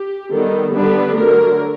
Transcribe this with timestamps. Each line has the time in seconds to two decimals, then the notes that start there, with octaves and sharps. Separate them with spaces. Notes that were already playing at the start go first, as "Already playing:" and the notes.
Already playing: G4
0.31 D#3 G3 B3 A4
0.73 D3 G3 B3 D4 B4
1.16 D3 F#3 A3 A#4